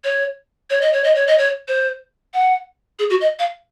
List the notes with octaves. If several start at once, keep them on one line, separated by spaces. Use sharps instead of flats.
C#5
C#5
D#5
C#5
D#5
C#5
D#5
C#5
C5
F#5
G#4
F#4
D#5
F5